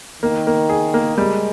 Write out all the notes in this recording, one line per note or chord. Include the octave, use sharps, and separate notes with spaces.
D#3 A#3
A#3
G#4
A#3
G3 G#3